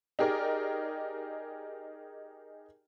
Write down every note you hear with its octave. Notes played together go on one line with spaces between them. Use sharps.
D#4 G4 G#4 A#4 D5